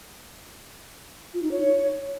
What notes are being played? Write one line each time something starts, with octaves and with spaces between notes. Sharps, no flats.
F4
D#4
C#5